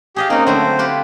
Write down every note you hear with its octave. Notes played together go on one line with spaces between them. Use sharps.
G4 G#4 D#5 F5
A#3 C4 C#4 D#4
D3 F#3 A3 C5
F4 G4 B4